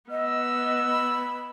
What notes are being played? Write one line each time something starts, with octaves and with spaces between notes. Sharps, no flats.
B3 D#5 E6
B5